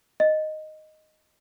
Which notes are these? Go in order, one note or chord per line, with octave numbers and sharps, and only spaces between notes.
D#5